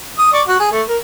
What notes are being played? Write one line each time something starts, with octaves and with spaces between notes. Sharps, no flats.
D#6
D5 C#6
F#4
G#4
A3
A#4